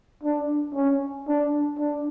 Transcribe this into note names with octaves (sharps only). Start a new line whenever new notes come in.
D4
C#4
D4
D4